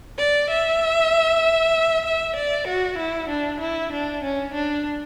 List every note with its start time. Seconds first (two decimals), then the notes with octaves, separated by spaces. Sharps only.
0.18 D5
0.50 E5
2.05 E5
2.36 D5
2.67 F#4
2.98 E4
3.29 D4
3.61 E4
3.92 D4
4.23 C#4
4.54 D4